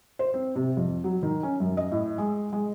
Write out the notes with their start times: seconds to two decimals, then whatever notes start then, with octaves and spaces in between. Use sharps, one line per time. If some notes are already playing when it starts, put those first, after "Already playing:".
0.19 C5
0.34 C4
0.56 C3
0.77 F2
1.04 F#3
1.23 D#3
1.43 C#4
1.60 F#2
1.77 D#5
1.91 A2
2.18 G#3
2.53 G#3